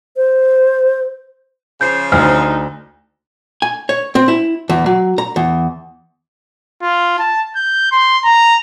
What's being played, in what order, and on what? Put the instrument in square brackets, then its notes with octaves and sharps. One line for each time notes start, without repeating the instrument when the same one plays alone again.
[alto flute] C5
[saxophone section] C#3 F3 C5 [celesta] G6 C7
[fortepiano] D2 [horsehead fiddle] D#4 [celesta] F6
[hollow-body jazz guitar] G#5
C#5
C4
E4
E2
F#3
A#5
E2
[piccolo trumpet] F4
A5
G6
C6
A#5